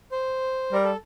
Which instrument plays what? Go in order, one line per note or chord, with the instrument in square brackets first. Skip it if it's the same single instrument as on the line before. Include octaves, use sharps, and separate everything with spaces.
[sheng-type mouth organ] C5
[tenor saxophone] G3 [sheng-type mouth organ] A#4
[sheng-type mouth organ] A4